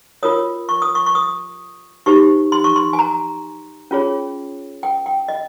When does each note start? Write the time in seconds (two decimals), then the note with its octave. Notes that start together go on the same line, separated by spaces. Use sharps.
0.23 F4 A#4 C#5 D#6
0.69 C#6
0.82 D#6
0.95 C#6
1.06 C#6
1.15 D#6
2.06 D#4 G4 C5 C#6
2.52 C6
2.64 C#6
2.76 C6
2.93 G#5
2.99 A#5
3.91 C#4 F4 G#4 C#5
4.83 G5
5.06 G5
5.28 D#5